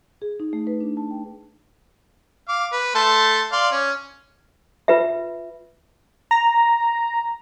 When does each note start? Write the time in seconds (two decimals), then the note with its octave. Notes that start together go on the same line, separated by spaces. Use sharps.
0.22 G#4
0.40 D#4
0.53 A3
0.67 B4
0.81 D4
0.97 A5
1.11 G5
2.49 F5 D6
2.72 B4
2.95 A3 A5 C6
3.52 D5 F5 C6
3.72 C#4
4.88 F4 B4 E5
6.31 A#5